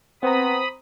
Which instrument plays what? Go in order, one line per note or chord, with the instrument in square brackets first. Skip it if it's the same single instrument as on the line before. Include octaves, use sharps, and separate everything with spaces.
[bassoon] B3 [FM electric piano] C4 C5 A#5 [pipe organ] B5 D#6